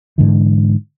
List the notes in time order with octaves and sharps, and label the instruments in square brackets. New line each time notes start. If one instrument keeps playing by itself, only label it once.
[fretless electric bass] G#2 D3 E3